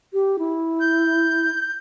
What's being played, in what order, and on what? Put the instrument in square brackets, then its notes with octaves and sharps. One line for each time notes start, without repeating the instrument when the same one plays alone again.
[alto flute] G4
E4
[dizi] G6